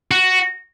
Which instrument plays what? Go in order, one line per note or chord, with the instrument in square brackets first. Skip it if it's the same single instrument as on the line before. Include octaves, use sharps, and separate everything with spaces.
[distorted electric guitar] F#4